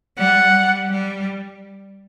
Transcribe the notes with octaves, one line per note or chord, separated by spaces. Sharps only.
G3 F#5
G3
G3